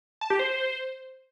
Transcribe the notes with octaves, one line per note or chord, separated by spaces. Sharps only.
A5
G4
C5